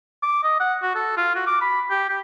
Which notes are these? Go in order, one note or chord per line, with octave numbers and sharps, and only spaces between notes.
D6
D#5
F#5
F#4
A4
F4
F#4
D6
B5
G4
G4